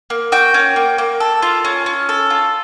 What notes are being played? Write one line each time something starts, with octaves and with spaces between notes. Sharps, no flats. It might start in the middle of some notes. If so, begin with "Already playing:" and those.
A#3
F#4 G5
C#4
A#3
A#3
A4
F4
C#4
C#4
A4
F4